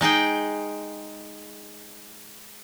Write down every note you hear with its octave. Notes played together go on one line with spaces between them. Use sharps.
G#3 D#4 G#4 G5